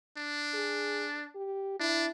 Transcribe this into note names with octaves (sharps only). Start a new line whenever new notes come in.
D4
G#4
G4
D4 E4